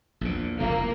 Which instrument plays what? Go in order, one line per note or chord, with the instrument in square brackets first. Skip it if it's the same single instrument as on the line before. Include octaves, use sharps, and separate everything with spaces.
[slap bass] A#1 E2 A#2
[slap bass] F1 A#1 E2 [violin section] A#3